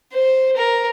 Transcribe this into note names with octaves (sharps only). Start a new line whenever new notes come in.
C5
A#4